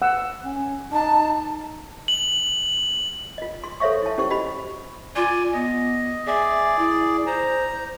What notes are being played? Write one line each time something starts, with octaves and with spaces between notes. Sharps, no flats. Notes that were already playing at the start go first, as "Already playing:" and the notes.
F#5 E6
C#4
D#4 A5
F#7
F4 D#5
C6
A4 C5 C#5 E5 F5 C#6
E4 A5
C#4 E4 G4 C5 C#6
F#4 G4 C5 D#5 B5
F4 D5 G#5
B3 D#5
G#4 D5 E5
E4
C5 A#5